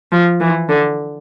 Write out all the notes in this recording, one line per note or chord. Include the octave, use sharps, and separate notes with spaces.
F3
E3
D3